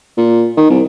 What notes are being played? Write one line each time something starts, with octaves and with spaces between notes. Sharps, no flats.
A#2
D#3
C2